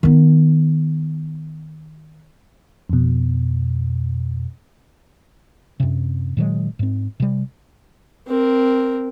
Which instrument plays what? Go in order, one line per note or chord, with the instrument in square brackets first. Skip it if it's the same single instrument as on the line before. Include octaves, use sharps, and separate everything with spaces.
[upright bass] D#3 B3
[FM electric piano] F2 B2
[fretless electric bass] F#2 C3
A#2 D#3 F#3 G#3
G#2 C4
C3 G3
[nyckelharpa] C4 A#4